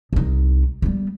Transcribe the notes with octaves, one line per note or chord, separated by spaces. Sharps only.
C2 D#4
G3 B3